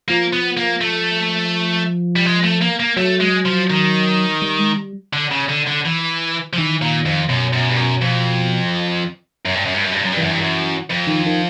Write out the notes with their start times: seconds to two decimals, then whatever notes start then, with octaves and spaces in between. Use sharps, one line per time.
0.08 F3 A#3
0.33 B3
0.57 A#3
0.81 A3
2.16 G3
2.25 G#3
2.43 A3
2.61 A#3
2.80 A#3
2.97 F#3 A3
3.21 G#3
3.46 F3
3.70 D#3
4.42 G3
4.59 G#3
4.77 G3
5.13 D3
5.31 C#3
5.49 D3
5.67 D3
5.86 E3
6.53 F3
6.57 D#3 E3
6.82 A#2
7.06 F2
7.29 F#2 B2
7.53 F#2
7.69 G2
7.77 F#2
8.01 F2
9.45 F#2
9.55 G2
9.65 F#2
9.74 G2
9.84 F#2
9.93 G2
10.03 F#2
10.13 G2
10.17 F#2 E3
10.31 G2
10.41 F#2
10.90 F2
11.07 D#3
11.26 D#3